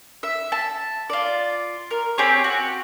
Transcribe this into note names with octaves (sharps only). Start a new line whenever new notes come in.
E5
A5
F4 D5
A#4
C4 G4 G#4 C#5
F#4